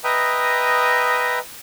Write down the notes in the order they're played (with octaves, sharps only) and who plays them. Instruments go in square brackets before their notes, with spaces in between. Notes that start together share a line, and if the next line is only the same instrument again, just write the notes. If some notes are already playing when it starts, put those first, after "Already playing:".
[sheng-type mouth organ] B4 D#5 E5 G5 A#5 D#6